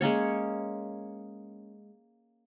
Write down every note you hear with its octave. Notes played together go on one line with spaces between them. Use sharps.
G#3 A#3 C#4 C#5